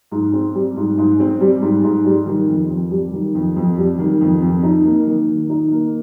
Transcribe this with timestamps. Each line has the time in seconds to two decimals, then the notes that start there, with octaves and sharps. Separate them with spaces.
0.12 G#2
0.33 C4
0.55 G3
0.77 G#2
0.98 G#2
1.20 C4
1.41 G3
1.62 G#2
1.84 G#2
2.05 G3
2.26 D#3
2.48 F2
2.70 F2
2.91 G3
3.13 D#3
3.35 F2
3.56 F2
3.78 G3
3.98 D#3
4.21 F2
4.42 F2
4.63 D#4
4.84 A#3
5.07 D#3
5.29 D#3
5.49 D#4
5.71 A#3